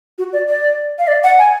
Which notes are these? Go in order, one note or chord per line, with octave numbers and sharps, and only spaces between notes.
F#4
D5
D5
F5
D5
F#5
G#5